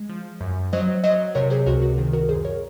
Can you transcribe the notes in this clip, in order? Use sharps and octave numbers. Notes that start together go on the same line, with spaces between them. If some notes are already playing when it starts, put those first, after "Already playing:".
Already playing: G#3
F3
F#2
F#3 C5 D#5
F#3 C5 D#5
C3 A#4 C#5
G#4 C5
C#2 F#4 A#4
F#4
D#3 G#4
F#4 A#4
F#2 G#4 C5
A#4 C#5